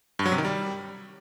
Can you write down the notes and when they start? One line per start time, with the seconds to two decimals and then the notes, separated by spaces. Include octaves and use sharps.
0.19 G2
0.26 F#3
0.32 C3
0.38 D#3
0.45 G3